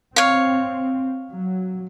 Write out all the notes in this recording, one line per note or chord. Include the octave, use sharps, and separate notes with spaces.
C4 C#5 F5
F#3